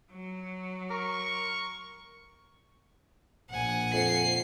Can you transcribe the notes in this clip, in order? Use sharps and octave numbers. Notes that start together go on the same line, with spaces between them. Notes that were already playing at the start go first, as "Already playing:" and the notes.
F#3
A#4 C#6
A#1 F#5 G#5
F2 C7